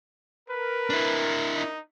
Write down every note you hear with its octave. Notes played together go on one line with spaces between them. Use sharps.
A#4 B4
D4 E4
D#4